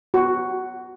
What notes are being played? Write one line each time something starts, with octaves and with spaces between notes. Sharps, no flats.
F#4